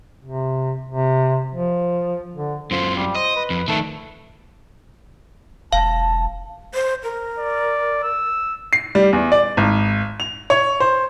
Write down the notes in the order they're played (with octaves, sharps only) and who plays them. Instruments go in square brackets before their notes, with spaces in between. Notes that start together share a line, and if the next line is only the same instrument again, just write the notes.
[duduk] C3
C3
F3
D3
[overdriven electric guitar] F#2 F4 [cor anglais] C5
[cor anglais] G3
[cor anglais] C5 [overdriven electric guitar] D#5
[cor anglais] B4
[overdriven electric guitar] F2
[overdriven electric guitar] D#3 A4 [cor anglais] A3
[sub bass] E1 [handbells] F5 [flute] A5
[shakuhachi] C5
A#4
[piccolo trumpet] D5
E6
[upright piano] C7
G3
E2
D5
G#1
F7
C#5
C5